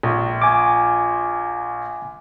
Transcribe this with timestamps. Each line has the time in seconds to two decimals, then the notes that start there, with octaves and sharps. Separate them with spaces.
0.03 A#1
0.42 G#5 D6